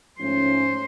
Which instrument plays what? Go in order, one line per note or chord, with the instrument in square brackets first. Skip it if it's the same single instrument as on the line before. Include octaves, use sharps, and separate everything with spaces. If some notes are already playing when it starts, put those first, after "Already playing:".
[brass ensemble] G#2 F3 A3 C#4 [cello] C5